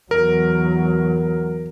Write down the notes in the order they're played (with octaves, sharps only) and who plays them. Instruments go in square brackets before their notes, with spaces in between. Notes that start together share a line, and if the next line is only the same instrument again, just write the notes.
[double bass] E2 F#3 [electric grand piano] A#4